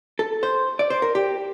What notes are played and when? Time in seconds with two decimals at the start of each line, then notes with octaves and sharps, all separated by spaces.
0.19 A4
0.43 C5
0.79 D5
0.90 C5
1.02 A#4
1.15 G4